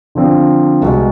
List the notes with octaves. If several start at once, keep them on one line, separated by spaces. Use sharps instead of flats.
D3 F3 C4 F4
C2 B2 G#3